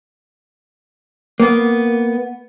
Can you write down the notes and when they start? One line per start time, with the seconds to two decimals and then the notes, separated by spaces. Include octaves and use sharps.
1.40 A#3 B3